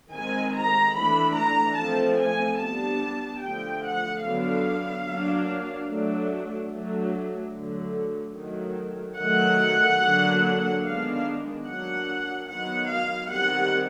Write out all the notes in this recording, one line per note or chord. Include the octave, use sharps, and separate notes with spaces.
D#3 G#3 C4 G#5
A#5
E3 A3 D4 B5
A#5
F3 A3 C4 A5
G#5
G3 B3 D4 A5
D3 F3 A3 G5
F#5
D3 F#3 B3 D4 F5
F#3 A#3 D4
F#3 A3 D4
F#3 A3 D4
D3 F#3 A3
D#3 F#3 A3
D#3 F#3 A3 F#5
D3 F#3 A#3 D4
D#3 G#3 B3 D4 F5
F#3 A#3 D4 F#5
D#3 F#3 B3 F#5
F5
D#3 G3 C4 F#5